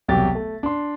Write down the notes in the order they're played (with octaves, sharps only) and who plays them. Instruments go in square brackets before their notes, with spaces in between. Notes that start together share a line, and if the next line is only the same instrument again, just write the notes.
[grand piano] E1 C2 F#3 G4 A6
A3
D4 C6